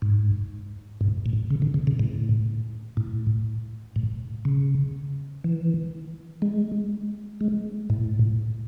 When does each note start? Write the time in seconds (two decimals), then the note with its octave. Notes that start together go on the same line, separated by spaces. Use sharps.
0.02 G#2
1.01 G#2
1.26 A2
1.50 C#3
1.62 D3
1.74 C#3
1.87 C#3
1.99 A2
2.97 A2
3.96 A2
4.45 C#3
5.44 E3
6.42 G#3
7.41 G#3
7.90 A2